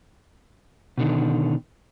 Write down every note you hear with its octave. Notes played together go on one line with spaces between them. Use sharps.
B2 D3 D#3